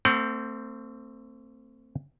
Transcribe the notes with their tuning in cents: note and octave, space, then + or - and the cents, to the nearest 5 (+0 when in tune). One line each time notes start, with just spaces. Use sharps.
A3 +35 C4 +0 F#5 +40